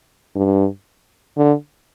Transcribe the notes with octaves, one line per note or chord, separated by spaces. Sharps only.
G2
D3